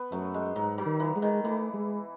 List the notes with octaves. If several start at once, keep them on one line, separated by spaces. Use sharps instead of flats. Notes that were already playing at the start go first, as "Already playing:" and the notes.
Already playing: B3
F#2 F#3 A3
G#3
G#2 F#3
F#3
D#3
E3
G#3
D#3
E3 A3
G#3